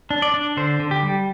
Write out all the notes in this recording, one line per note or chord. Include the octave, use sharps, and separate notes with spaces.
D4
D5
D4
D3 C5
D3
G4
G3